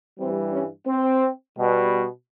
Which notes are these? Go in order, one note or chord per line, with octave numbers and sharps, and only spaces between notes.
G2 E3 G3 C4
C#4
C4
B2 G3